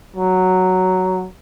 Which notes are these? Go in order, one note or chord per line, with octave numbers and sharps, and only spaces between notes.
F#3